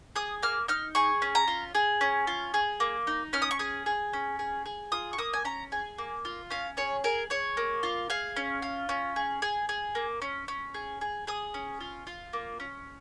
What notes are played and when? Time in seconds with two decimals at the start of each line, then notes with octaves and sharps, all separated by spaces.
0.16 G#4 D#6
0.43 A#3 F6
0.68 D#4 F6
0.95 G#4 C#6
1.22 C#4
1.35 A#5
1.48 F4
1.75 G#4
2.01 C#4
2.27 F4
2.54 G#4
2.80 A#3
3.07 D#4
3.33 C#4 F6
3.42 D#6
3.51 C#6
3.59 G#4 D#6
3.86 G#4
4.13 C#4
4.39 G#4
4.66 G#4
4.92 F4 D#6
5.13 C#6
5.18 A#3 D#6
5.33 G#5
5.45 C#4 A#5
5.72 G#4 G#5
5.98 A#3
6.25 F4
6.50 C#4 F5
6.77 G#4 C#5
7.04 G#4 A#4
7.30 G#4 C#5
7.57 A#3
7.83 F4
8.10 G#4 F5
8.36 C#4
8.62 F4
8.89 C#4
9.16 G#4
9.42 G#4
9.69 G#4
9.95 A#3
10.22 C#4
10.48 C#4
10.74 G#4
11.01 G#4
11.27 G#4 D#6
11.54 C#4
11.80 F4
12.07 F4
12.33 A#3
12.60 C#4